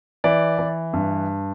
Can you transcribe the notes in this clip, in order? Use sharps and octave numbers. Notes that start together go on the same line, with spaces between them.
E3 D5
E3
G2